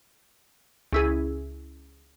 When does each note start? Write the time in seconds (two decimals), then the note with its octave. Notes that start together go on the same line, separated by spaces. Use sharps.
0.93 C#2 E4 G#4